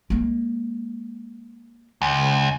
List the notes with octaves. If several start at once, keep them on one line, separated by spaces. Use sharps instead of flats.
G#3 A#3
C#2